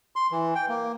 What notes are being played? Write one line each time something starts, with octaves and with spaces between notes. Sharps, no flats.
C6
E3
G5
A#3